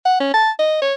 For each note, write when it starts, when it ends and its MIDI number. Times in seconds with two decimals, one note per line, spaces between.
0.05 0.19 78
0.20 0.32 61
0.34 0.50 81
0.59 0.78 75
0.82 0.94 73